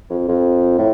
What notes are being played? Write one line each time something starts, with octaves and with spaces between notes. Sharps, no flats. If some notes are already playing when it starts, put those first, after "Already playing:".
F2
F2
A2